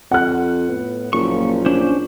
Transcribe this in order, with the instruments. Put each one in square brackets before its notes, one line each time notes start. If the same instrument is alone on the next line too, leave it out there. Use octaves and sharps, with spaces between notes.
[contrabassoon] F2 [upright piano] F#5 F#6
[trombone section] A2 B3
[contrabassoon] F#1 [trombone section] A#2 F3 F4 [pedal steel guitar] C#6
[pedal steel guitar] C#4 D4 C5